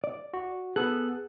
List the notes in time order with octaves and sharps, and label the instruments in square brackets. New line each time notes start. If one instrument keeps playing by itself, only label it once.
[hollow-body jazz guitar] D5
[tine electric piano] F#4
[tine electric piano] B3 A4 F#6 [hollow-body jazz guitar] G#4